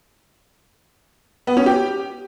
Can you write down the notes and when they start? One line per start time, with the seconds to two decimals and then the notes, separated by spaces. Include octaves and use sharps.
1.47 B3
1.57 C#4
1.66 G4